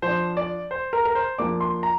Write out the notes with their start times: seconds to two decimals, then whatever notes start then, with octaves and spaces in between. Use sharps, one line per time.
0.02 F3 C5
0.08 D4
0.37 D5
0.71 C5
0.93 A#4
1.05 A#4
1.15 C5
1.38 F3 A#3 D4 D6
1.61 C6
1.83 A#5